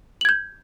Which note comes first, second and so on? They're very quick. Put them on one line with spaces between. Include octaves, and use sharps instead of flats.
F#7 G#6 G6